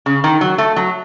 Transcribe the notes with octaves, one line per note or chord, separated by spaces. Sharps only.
C#3
D#3
F#3
A3
F#3